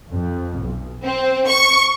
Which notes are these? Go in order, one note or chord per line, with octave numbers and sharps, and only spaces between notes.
F2
B1
C4
C#6